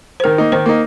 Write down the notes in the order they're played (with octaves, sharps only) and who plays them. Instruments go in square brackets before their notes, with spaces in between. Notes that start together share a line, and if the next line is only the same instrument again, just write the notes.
[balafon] C5
[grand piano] D#3 [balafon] A#4
[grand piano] A#3 D#4
[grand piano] D#3 [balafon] C5
[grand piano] A#3 D#4